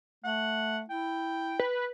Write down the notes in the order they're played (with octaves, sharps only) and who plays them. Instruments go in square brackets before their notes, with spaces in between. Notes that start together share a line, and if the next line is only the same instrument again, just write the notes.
[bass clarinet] A3 [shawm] F#5
[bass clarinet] E4 [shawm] G5
[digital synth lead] B4